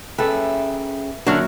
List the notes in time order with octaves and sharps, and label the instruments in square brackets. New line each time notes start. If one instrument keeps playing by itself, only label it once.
[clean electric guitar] C#4 G#4 G5 [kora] A4 B4 [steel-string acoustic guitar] E5
[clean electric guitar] A#2 E5 [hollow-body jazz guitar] D3 D4 [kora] F#3 F#4 A#4 [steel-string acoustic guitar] C#4